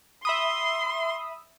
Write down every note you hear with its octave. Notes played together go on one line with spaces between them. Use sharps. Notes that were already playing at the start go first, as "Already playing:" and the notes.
E5 B5 C6 D#6